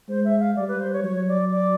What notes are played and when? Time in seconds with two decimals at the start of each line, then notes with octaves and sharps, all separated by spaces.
0.08 G#3 C5
0.25 E5
0.40 F5
0.56 G3 D5
0.68 B4
0.80 C5
0.93 C#5
1.04 F#3 C#5
1.28 D5
1.51 D5